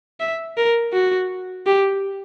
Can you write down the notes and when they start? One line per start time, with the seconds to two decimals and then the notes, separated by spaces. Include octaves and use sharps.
0.20 E5
0.57 A#4
0.93 F#4
1.67 G4